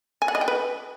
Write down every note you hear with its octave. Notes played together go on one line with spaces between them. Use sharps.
G#5
F#5
D#5
G5
B4